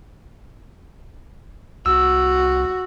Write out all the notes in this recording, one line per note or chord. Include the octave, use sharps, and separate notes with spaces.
C2 F#4 E6